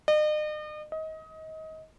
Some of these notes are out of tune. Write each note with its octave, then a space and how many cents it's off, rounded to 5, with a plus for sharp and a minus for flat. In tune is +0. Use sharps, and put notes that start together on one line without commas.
D#5 -40
D#5 +25